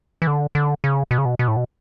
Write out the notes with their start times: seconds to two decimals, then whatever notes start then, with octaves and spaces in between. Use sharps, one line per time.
0.22 E3
0.27 D3
0.55 D3
0.84 C#3
1.11 B2
1.18 C#3
1.25 B2
1.39 B2
1.48 A2
1.57 B2